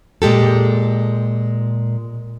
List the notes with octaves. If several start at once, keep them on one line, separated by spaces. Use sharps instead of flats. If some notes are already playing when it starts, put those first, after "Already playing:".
A#2 G#3 G4 A4